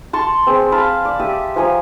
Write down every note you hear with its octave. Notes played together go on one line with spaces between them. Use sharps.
A5 C6 C#6
C4 G#4
F5 A5 B5
D5
G4 E5 D#6
F3 G#5 A#5 D#6